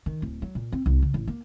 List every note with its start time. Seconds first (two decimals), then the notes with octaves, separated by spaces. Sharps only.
0.06 D#3
0.22 D1
0.42 F#3
0.55 A#2
0.72 C4
0.86 C2
1.02 C#3
1.14 A1
1.27 A#3